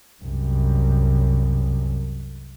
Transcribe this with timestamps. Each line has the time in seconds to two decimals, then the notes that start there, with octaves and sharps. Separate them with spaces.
0.23 C2 F#2